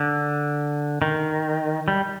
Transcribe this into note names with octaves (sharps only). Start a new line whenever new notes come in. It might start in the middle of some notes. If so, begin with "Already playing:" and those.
Already playing: D3
D#3
G3